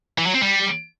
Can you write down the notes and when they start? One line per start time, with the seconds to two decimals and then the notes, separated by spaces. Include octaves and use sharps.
0.18 E3
0.26 F#3
0.34 C4
0.42 G3